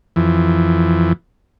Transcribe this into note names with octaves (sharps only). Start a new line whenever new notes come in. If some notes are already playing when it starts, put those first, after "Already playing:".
F2 E3